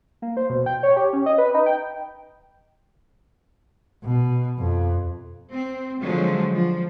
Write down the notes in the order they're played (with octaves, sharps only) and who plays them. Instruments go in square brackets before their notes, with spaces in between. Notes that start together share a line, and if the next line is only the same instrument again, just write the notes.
[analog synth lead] A#3
C5
B2
G5
C#5
G4
C#4
D#5
B4
D#4
G5
[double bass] B2
F2
[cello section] C4
D3 F3 F#3 G#3
F3